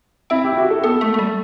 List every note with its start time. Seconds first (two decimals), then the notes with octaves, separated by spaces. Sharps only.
0.30 C4 E4
0.44 G4
0.52 E4
0.57 F#4
0.70 A4
0.84 B3 A4
1.01 A3
1.14 A3
1.19 G3